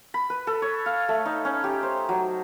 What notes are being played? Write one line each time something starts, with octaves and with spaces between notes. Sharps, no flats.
B5
B4
A4
C#5
F5
A3
D#4
C#4
G4
C5
F#3